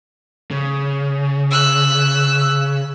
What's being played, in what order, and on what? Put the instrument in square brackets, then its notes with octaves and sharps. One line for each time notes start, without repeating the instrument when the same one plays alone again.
[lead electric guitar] C#3
[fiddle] E6 F#6